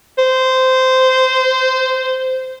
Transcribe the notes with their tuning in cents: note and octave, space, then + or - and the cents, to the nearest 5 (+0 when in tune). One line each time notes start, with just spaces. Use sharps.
C5 -15